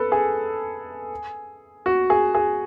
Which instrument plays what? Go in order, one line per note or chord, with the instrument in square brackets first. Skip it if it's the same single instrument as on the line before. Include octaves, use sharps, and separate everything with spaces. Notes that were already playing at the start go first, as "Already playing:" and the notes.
Already playing: [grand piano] A4 B4
G#4
F#4
G#4
G#4